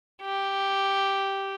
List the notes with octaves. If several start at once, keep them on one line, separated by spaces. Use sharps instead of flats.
G4